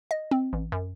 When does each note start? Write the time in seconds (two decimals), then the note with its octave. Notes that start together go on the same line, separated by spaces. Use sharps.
0.11 D#5
0.31 C4
0.53 A1
0.72 F#2